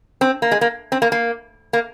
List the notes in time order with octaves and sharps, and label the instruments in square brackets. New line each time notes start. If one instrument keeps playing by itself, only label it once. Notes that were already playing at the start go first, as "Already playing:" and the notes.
[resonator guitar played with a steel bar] C4
A#3
G#3
A#3
C4
A#3
A#3
A#3